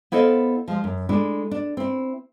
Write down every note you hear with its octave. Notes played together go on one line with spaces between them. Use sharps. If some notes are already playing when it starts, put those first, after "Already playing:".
B3 E4 A4 C5 D#5 F5
F3 G#3
F#2
G#3 A3 D4 E4
D4
C4 E4